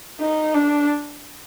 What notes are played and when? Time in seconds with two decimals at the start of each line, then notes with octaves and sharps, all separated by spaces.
0.20 D#4
0.54 D4